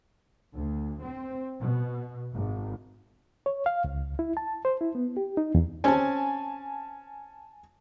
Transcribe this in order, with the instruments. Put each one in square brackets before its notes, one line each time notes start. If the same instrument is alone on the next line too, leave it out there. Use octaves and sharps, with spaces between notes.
[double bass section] D2
C4
B2
G#1
[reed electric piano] C#5
F5
C#2
E4
A5
C5
E4
B3
G4
D#4
E2
[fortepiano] C4 C#4 [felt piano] G#5 A5